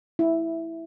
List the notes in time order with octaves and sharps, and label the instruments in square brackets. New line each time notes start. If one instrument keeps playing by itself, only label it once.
[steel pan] E4